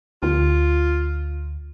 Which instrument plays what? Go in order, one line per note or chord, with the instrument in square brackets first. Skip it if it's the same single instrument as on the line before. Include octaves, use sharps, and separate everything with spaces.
[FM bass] D2 [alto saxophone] F4